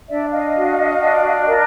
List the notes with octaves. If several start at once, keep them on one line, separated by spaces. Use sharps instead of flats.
D4 D5 E5
D#5 F5
F#4
D4
A#4